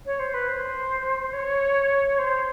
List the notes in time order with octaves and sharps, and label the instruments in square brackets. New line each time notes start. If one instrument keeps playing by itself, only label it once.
[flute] C#5
C5
B4
C5
C#5
C5